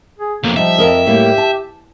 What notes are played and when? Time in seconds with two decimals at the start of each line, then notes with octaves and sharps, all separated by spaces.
0.19 G#4
0.44 B1 F2 A#3
0.56 F3 G3 D#4 E5
0.78 F2 A#4 D#5
1.06 A2 G3 A#3 G4
1.38 A5